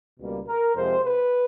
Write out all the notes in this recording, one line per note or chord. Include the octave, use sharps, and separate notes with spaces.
C#2 B2 G3 A#3
A#4
F2 C3 F3 G#3 C4 C5
B4